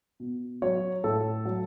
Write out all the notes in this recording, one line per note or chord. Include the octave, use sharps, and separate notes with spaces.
B2
F#3 C#5
A2 A4
F#3